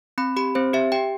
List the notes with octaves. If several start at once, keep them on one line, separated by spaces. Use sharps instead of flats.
C4 B5
G4 B5
C4 C5
G4 E5
G4 G5